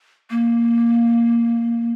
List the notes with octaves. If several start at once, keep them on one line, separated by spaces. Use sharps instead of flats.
A#3